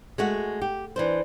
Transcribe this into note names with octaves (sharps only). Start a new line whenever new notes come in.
G#3 A3 F#4
G4
E3 D4 C5